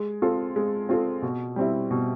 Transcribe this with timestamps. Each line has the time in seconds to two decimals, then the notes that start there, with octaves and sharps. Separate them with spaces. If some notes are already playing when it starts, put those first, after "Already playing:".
Already playing: G#3
0.22 C4 F4 A4
0.56 G#3
0.89 C4 F4 A4
1.22 B2
1.56 G3 C4 E4
1.91 B2